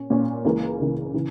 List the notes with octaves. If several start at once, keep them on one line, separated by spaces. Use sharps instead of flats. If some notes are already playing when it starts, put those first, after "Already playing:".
Already playing: A#2 C#4
A#2 A#3 C#4
C#2 C#3 E3 A#3
C#2 C#3 E3 A#3
C#3 E3